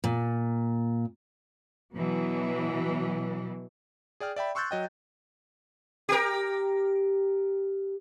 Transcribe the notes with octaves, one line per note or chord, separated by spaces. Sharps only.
A#2
B2 E3 F#3
G#4 D5 G5 F6
D5 E5 G5 B5
C6 C#6 E6 F#6 G6 A6
F#3 D#5 G5
G4 A#4